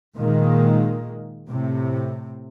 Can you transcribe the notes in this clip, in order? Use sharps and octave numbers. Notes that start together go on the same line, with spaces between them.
A#2 D#3 G#3 A#3
A2 C3